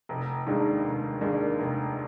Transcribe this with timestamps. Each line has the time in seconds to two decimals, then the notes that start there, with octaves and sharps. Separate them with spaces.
0.09 F1
0.47 D#2 D#3 G#3 D4
0.83 F1
1.21 D#2 D#3 G#3 D4
1.59 F1